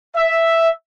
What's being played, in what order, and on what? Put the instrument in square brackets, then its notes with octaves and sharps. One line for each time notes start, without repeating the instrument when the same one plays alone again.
[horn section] E5